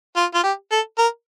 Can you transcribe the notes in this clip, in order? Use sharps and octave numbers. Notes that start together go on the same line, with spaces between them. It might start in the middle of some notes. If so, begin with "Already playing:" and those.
F4
F4
G4
A4
A#4